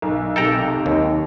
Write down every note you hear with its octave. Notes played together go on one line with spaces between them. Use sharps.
B1
B1 C3 A4 G5 A#5
D#2